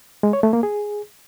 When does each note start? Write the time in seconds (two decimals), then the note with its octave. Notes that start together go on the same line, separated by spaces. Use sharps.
0.23 G#3
0.33 C#5
0.43 A3
0.53 A#3
0.63 G#4